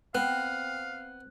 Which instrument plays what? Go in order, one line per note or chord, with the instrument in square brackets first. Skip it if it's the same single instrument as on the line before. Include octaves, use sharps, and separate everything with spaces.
[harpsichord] B3 [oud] C4 [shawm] F5 [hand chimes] F#6